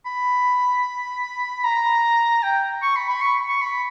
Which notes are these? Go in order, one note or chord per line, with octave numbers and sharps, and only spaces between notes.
B5
A#5
G5
C#6
B5
B5
C#6
C#6
B5